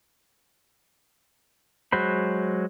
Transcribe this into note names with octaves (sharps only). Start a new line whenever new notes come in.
F#3 G#3 F#4 C5 B5